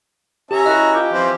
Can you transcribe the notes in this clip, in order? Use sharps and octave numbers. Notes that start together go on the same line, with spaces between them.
C#4 G4 E5 A#5
A#3 E4 F#4 D#5
F4 G4
E3 F3 C4